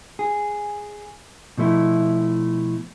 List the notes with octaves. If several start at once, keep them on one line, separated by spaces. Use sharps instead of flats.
G#4
B2 F3 A3 E4